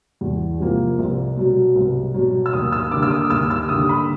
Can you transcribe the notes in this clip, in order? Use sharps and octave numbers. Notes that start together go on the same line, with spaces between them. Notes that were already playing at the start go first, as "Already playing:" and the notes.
E2
C3 F3 A#3
C2
B2 F#3
C2
B2 F#3
E6
D#2 D#6
E6
D3 G3 A#3 D6
E6
D#6
D#2 E6
E6
D3 G3 A#3 D#6
B5